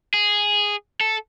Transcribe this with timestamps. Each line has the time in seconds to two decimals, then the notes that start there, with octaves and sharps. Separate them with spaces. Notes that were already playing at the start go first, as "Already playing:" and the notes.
0.14 G#4
1.01 A4